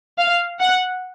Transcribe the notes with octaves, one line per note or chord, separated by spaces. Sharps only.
F5
F#5